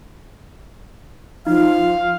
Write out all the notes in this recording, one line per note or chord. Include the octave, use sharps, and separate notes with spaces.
F3 D#4 F5